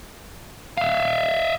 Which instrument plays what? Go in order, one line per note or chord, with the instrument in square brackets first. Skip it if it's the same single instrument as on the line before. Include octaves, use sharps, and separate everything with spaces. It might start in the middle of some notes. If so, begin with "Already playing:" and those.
[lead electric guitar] E5 F5